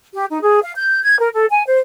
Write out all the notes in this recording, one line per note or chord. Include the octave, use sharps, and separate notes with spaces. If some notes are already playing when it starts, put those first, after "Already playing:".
G4
D#4
G#4
F5
G6
G#6
A#4
A4
G#5
C5